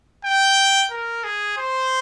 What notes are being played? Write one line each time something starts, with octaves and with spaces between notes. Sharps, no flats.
G5
A#4
G#4
C5